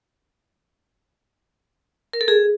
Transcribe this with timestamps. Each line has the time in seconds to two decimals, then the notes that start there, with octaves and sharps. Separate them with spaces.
2.13 A#4
2.21 A4
2.28 G#4